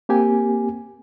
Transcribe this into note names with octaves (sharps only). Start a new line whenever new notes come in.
A#3 C4 G4 G#5